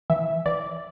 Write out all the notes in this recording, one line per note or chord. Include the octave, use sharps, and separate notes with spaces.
E3 E5
E3 D5